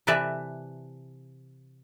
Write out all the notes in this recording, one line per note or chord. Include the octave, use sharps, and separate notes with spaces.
C3 E3 B4 D5 E5 A5